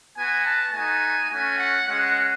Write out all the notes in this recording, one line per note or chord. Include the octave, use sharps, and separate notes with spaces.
B3 F#4 G#5
A5
A3 D#4 F#4 G#5
A3 C#4 F#4 G#5
F#5
G#3 C#4 F#4 F#5